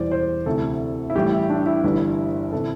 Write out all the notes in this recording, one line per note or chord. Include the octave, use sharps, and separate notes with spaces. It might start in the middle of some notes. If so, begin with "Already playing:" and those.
Already playing: E1 E2 E3 G3 C5 D5
C5
D2 C3 E3 A4
E4
A1 A2 E3 G3 G4
E4
D4
E4
G1 G2 E3 G3
C3 E3 A4